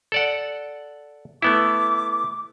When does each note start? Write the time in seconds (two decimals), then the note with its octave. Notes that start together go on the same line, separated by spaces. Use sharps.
0.12 A4 D5 F#5
1.42 A3 B3 E4 D6